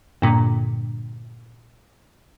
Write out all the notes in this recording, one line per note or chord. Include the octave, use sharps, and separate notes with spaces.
G2 A#2 D3